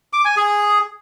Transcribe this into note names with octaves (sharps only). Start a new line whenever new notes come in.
D6
G#5
G#4